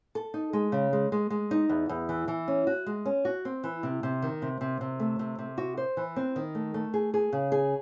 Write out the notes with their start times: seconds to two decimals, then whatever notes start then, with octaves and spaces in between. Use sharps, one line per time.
0.15 A4
0.34 D#4
0.53 G#3
0.72 C#3
0.93 G#3
1.12 G#3
1.30 G#3
1.51 D#4
1.69 E2
1.89 E2
2.09 E3
2.28 E3
2.48 C#4
2.67 F#4
2.86 G#3
3.06 C#4
3.25 F#4
3.45 C4
3.64 E3
3.83 C3
4.03 C3
4.22 D#3
4.42 C3
4.61 C3
4.81 C3
5.00 A3
5.19 C3
5.39 C3
5.58 F#4
5.77 C5
5.97 E3
6.16 C4
6.36 D#3
6.55 A3
6.74 A3
6.94 G#4
7.14 G#4
7.33 C#3
7.52 G#4